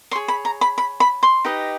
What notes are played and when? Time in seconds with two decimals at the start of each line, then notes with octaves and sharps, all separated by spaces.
0.11 G#4 C#5 C6
0.28 B5
0.45 A#5
0.61 B5
0.78 B5
1.00 B5
1.23 C6
1.45 D#4 G4 B4 D#5